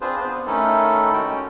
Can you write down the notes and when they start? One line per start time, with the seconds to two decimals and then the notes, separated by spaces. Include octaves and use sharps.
0.01 C4 D4 F4 G#4 B4 C5
0.20 B3
0.47 D#3 A3 C#4 D#4 E4 A4
1.14 G#3 F#4 G5
1.30 C#4